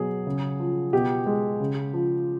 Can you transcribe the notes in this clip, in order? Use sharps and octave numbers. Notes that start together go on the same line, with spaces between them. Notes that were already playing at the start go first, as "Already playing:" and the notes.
Already playing: B2 F#3 G#4
C#3
F3
B2 G4
G#3
C#3
F3